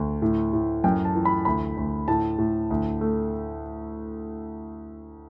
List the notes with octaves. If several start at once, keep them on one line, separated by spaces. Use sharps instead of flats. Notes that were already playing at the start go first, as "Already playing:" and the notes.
Already playing: D2
A2
A2
F#2 G5
A5
E3
B5
D2 B5
D2
A2 A5
A2
D2
A3